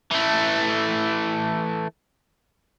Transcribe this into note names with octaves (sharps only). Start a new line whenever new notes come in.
E3 A3